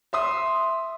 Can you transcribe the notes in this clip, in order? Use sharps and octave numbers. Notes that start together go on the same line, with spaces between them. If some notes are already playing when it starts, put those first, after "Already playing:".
E5 C6 D#6